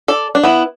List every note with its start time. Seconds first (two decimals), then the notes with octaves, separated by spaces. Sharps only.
0.08 A4 D5
0.35 D4
0.43 B3 E4